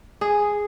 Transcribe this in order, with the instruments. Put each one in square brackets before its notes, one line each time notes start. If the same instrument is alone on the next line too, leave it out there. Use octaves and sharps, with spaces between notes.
[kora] G#4